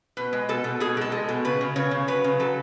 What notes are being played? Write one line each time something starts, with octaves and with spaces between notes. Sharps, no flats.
B2 B4
G#3
B2 A4
B2
B2 G#4
G#3 A4
G#3
B2
C#3 B4
C#3
C#3 C#5
C#3
F#3 B4
C#3
F#3 A4